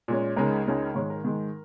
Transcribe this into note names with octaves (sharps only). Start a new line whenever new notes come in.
A#2 G#3 C#4
C#2 C#3 G#3 D#4 A#4
C#2 C#3 G#3 D#4
G#2 D#3 G#3 C#5
A#4
G#2 D#3 G#3